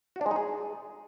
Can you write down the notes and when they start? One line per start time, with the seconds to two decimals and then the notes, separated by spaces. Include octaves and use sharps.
0.16 F#4
0.21 D4
0.26 G#3
0.31 D#4
0.36 G#4